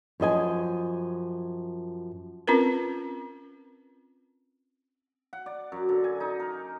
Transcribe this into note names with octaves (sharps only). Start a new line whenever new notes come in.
F#2 F3 D#5 G#5
C4 C#4 F4 A#4 B4
F#5
D5
F#2
D3
G#5
D#4
A#4